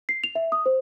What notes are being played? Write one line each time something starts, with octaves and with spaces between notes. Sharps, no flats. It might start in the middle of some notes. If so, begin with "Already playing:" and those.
C7
F7
E5
D#6
C5